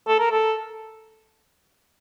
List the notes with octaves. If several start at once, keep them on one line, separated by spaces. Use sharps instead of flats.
A4
A#4
A4